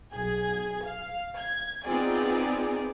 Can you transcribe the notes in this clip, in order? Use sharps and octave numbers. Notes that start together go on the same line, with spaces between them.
B1 G#4 G#6
F5
G#6
B3 C4 D#4 F4 G#4 D5